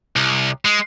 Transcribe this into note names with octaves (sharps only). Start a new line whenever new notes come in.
C2
G#3